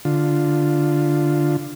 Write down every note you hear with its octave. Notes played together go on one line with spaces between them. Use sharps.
D3 F4